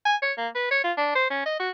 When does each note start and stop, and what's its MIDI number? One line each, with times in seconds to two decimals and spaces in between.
0.05 0.15 80
0.22 0.33 73
0.37 0.48 58
0.55 0.71 71
0.71 0.81 73
0.84 0.93 65
0.97 1.15 62
1.15 1.29 72
1.30 1.44 61
1.46 1.57 75
1.59 1.70 66